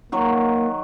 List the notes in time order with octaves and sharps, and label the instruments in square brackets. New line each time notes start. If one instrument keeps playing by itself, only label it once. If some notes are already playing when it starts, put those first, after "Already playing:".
[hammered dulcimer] D#3 F#3 [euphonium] A#3